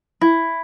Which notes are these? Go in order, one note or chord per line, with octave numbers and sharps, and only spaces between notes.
E4